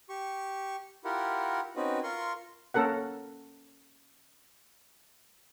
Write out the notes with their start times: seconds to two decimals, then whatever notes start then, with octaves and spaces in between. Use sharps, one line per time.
0.09 G4 C#6
1.04 E4 F4 G4 A#4 F#5
1.76 C4 C#4 D#4 F#4 B4
2.03 F4 A#4 C6 C#6
2.74 A#3 C#4 A4 A#4 F#5